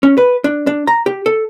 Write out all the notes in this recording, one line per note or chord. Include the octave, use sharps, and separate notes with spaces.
C#4
B4
D4
D4
A#5
G4
A4